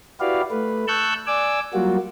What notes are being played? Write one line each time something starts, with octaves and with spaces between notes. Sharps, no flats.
E4 F#4 G4 B4 D5 F5
A3 B4
A5 C#6 E6 F#6 G6
D5 G#5 D6 E6
F#3 G3 A#3 F4 F#4